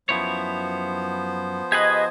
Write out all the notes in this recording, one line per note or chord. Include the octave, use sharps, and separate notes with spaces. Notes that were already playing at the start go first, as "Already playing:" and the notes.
F#2 F3 B3 E4 C5 C#5
G4 G#4 B4 D#5 G#6